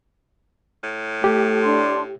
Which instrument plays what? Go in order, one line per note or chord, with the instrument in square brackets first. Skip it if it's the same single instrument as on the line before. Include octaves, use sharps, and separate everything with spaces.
[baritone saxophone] A2
[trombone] A3 [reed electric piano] G4
[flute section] D4 C6